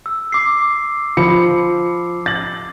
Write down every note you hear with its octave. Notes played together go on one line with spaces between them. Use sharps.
E6
D6 C7
F3 B5 C#7
A6 F#7